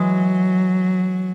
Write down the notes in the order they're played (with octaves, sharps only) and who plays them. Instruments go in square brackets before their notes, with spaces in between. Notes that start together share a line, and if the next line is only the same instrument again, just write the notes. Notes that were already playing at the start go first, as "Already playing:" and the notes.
Already playing: [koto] E3 G#3 [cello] F#3